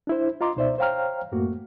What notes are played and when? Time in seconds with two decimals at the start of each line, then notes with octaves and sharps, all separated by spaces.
0.07 D4 E4 C5
0.41 F4 D#5 A#5 C6 D6
0.56 C#2 B2 D#4 C5 D5 E5
0.78 C5 C#5 F5 G5 A#5 F6
1.32 F#2 A2 A3 A#3 F#4